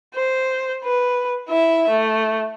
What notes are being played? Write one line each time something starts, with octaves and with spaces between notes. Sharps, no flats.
C5
B4
E4 E5
A3